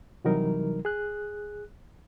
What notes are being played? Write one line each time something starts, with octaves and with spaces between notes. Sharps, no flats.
C3 E3 F#3 G3 D#4 A#4
G#4 F#6